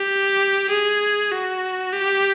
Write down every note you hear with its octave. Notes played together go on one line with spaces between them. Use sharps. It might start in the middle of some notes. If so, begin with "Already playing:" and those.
Already playing: G4
G#4
F#4
G4